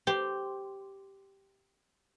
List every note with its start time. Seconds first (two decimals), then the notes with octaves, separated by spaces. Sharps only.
0.07 G4 C5